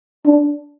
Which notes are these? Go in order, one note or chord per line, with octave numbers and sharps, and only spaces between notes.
D4